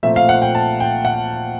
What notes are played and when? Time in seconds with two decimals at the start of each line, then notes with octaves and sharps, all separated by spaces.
0.03 A#2 F3 A3 C4 E5
0.16 F5
0.29 F#5
0.42 G5
0.55 A5
0.80 G5
1.05 F#5